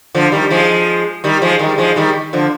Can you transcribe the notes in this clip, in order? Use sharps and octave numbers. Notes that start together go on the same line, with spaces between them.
D3 F3
D#3 G3
F3 G#3
D#3 G3
F3 G#3
D#3 G3
F3 G#3
D#3 G3
D3 F3